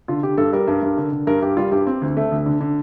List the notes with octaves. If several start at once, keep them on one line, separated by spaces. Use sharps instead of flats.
D3 F4
D3 G4
G2 A4
G3 A#4
G2
G2
D3
D3
G2 A#4
G2 G4
G3 F4
G2 G4
C4
D2
A3
D2
D3
D3